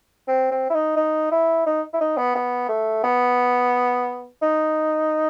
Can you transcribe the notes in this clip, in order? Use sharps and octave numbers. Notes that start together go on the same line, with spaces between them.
C4
C4
E4
D#4
D#4
E4
D#4
E4
D#4
B3
B3
A3
B3
D#4